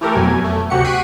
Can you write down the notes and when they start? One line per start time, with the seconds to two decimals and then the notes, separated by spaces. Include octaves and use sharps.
0.01 E3 A3 G4 A4 A#4
0.15 F2 B2 F#3 G#5
0.44 A3
0.70 D2 C3 F#4 G4 F#5 C#7
0.84 F#5 C#6 B6 C7 D7 D#7